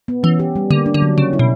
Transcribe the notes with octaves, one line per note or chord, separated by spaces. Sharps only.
B3
E3 C#4
G4
G3
D3 A#3
D4
D3
F#3
C#3 C#4
E4
B2